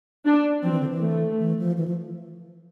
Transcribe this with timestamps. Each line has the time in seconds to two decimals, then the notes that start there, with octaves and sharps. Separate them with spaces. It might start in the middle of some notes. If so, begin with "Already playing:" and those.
0.26 D4
0.63 F3 C4
0.71 E3
0.80 D3
0.89 E3
1.01 A3
1.39 E3
1.59 F3
1.77 E3
1.88 F3